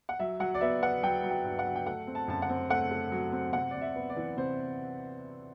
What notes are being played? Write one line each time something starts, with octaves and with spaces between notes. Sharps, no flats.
F#5
F#3 E5
F#3 F#5
D5
B3 E5
B3 F#5
F#3 G5
F#3
G5
G2
F#5
F#3
G5
A3 F#5
C4
A5
F#2 A5
F#5
C4
A3 F#5
A3
F#3
C4
C3 F#5
C3 D5
E5
B3
D5
E3
C3 C5